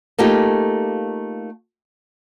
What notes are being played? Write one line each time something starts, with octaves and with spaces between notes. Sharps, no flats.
A3 A#3 D#4 F4 G4